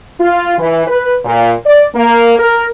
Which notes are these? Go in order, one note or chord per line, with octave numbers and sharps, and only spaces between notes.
F4
E3
B4
A#2
D5
A#3
A#4